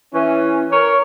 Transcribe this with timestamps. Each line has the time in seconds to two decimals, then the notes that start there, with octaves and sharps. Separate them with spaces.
0.13 E3 C#4
0.70 A#4 C#5